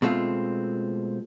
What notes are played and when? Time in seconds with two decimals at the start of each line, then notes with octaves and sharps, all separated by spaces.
0.02 B2 G#3 A3 C4 F4